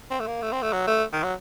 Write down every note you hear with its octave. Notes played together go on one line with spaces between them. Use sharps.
C4
A3
A#3
A3
C4
A3
F#3
A3
D#3
F#3